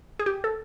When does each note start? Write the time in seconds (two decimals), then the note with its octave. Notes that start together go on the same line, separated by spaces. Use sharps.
0.19 G#4
0.26 G4
0.44 A4